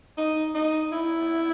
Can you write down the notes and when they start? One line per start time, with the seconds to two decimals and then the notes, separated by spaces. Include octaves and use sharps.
0.18 D#4
0.55 D#4
0.92 E4